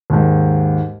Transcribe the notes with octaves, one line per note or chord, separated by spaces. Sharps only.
D#2 G#2